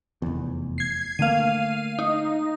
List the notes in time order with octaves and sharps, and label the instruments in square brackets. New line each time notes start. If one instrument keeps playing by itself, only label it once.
[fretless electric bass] F1 E2
[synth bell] G#6 C7
[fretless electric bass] D3 A3 A#3 [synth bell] F5 D#7
[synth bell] D#4